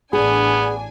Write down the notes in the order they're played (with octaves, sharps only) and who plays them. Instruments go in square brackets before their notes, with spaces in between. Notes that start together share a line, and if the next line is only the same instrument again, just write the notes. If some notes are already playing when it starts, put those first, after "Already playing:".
[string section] A1 D4 G#5 [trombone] B3 [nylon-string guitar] G#4